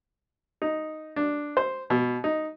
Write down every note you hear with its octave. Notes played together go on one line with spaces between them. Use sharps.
D#4
D4
C5
B2
D#4